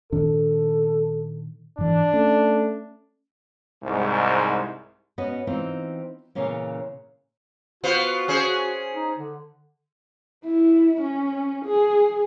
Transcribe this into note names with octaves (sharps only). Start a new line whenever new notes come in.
A#2 D#3 D4 A4
G#2 E3 D4
A3 C#4
C2 G#2
B3 C#4 F#4 D#5
E3 C4 D#4 F4
A#2 C#3 E3 A#3 C#4 F4
B3 F4 F#4 C5
C#4 G#4 C5
D#4
D3
E4
C#4
G#4